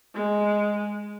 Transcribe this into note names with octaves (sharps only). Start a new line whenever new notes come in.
G#3